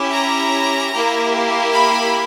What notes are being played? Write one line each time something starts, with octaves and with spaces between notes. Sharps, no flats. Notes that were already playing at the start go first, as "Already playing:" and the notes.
Already playing: C#4 E4 G4
A#5
A#3 E4 G4
B5